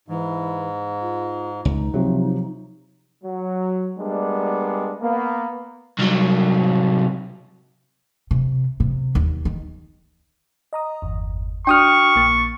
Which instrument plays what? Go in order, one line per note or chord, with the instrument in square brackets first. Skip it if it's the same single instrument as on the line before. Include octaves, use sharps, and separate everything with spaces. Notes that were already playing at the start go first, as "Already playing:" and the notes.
[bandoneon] G#2 [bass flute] E3
[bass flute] F4
[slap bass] C#2 [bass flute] D#4
[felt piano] C3 F3 [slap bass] F#3
[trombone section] F#3
G3 G#3 A#3 B3 D4
A#3 B3
[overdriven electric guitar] C2 F#3
[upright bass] C3
C3
D#2
D#3
[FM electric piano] D#5 A#5 D#6
G1 E2
[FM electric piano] D4 F#4 [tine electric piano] G5 D#6 F6 [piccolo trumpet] C#6
[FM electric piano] A#1 A#3 A6